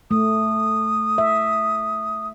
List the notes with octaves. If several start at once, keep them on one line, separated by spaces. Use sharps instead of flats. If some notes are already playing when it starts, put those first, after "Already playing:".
A3 D#6
E5